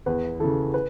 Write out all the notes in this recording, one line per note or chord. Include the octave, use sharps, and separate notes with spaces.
E2 B4
C#3 E3 A4
B4